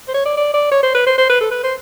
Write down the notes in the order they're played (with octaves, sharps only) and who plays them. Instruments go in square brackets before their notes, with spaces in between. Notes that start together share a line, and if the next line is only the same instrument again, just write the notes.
[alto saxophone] C5
C#5
D5
D5
D5
C#5
C5
B4
C5
C5
B4
A4
B4
C5